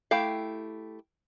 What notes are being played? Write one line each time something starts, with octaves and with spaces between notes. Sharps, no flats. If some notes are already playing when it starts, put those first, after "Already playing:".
A3 E4 G4 F5